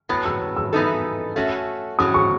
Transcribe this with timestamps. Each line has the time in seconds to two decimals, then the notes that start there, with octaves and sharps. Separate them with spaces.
0.09 A2 F#3 B3
0.25 E6
0.56 E6
0.73 E3 B3 D#4 A4
1.36 A3 C#4 F#4 A4
1.99 A2 F#3 C#4 D#6
2.14 C#6